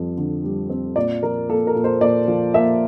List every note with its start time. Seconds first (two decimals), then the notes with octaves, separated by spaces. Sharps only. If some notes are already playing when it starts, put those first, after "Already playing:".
Already playing: F2 G3 C4
0.17 D3
0.44 G3
0.70 C4
0.96 A#2 D5
1.23 F3 A#4
1.49 A#3 A4
1.67 A#4
1.75 A#2
1.84 C5
2.01 A#2 D5
2.28 F3
2.54 A#3 E5